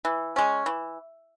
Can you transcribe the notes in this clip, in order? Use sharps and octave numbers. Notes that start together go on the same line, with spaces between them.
E3
G#3 C#4
E3